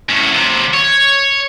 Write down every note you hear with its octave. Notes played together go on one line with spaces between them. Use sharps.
F#2 A2
D#2 C3
C#5